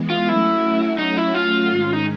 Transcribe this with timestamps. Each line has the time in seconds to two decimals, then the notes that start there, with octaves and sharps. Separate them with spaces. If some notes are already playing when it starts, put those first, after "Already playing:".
Already playing: E3 G#3 B3
0.10 F4
0.28 F#3 A3 C#4 E4 F#4
0.98 D#4
1.17 E4
1.34 F4
1.70 G#2 D#3 G#3 C#4
1.93 D#4